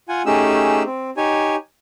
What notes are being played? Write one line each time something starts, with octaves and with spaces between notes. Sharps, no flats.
F4 F#5 G#5
A3 C#4 D#4 G4 G#4 E6
C4
D#4 G4 C#5 G#5